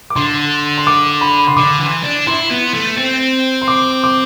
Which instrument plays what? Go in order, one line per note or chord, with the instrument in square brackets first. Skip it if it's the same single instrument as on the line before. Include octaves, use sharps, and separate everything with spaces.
[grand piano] D6
[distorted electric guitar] D3 [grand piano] C6
[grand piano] C6
D6
B5
C6
[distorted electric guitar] D3 [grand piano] D6
[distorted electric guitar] E3
D4
[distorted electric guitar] E4 [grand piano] C6
[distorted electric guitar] B3
A3
C4
[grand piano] C6
D6
D6